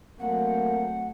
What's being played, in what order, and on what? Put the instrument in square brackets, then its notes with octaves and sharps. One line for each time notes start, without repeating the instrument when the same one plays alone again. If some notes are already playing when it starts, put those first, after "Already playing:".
[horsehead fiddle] F#3 C4 [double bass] A3 [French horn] A#3 [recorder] F#5